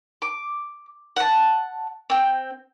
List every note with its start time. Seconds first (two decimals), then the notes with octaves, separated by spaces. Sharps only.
0.22 D6
1.16 F#5 A5
2.10 C4 G5